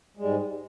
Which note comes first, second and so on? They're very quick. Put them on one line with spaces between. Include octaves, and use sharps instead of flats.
G#3 G3 G#2